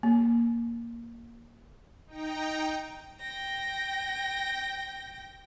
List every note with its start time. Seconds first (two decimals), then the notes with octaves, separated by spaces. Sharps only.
0.03 A#3
2.07 D#4 G5 A#5
3.20 G5 A#6